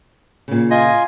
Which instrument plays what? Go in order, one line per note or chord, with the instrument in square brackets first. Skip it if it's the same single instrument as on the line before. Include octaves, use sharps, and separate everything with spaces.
[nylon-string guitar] A#2 C#3
[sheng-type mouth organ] F4 G#5 [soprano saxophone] D#5